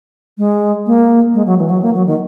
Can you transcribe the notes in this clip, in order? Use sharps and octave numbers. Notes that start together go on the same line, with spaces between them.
G#3
A#3
G#3
F#3
E3
F#3
A#3
F#3
D#3